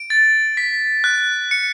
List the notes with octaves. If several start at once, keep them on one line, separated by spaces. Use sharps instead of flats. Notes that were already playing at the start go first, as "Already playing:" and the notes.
Already playing: D7
A6
B6
F#6
C#7